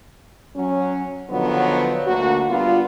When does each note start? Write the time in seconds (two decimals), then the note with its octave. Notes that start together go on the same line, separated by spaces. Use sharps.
0.56 F#3 C#4
1.30 B2 D3 D#3 F3 F#3 B3
2.07 D2 A#3 F#4
2.49 G3 B3 D4 F4